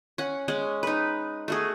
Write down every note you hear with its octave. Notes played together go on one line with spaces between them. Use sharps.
C#4 F#5
G#3 C#4 F#5
D#4 B4
A3 F#4 G#4